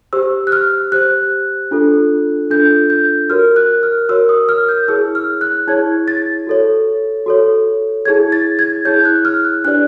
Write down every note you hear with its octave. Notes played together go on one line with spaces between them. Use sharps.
G4 C5 E6
F#6
F6
G4 C5 F#6
D4 F4 A4
D4 F4 A4 G6
G6
F#4 A#4 C#5 F6
F#6
F6
F#4 A#4 C#5 E6
D#6
F6
G6
E4 G#4 C#5 E6
F6
F#6
E4 G#4 C#5 G#6
A6
F#4 A4 C#5
F#4 A4 C#5
E4 G#4 C#5 G#6
A6
G#6
E4 G#4 C#5 G6
F#6
F6
F#6
D4 G4 B4 D5 F#6